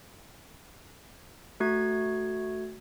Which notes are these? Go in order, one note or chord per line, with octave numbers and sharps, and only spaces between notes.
A3 F#4 G#6